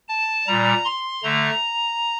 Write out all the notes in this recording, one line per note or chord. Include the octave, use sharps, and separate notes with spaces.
A5
A#2 G3 A#5
C6
D3 A3 A#5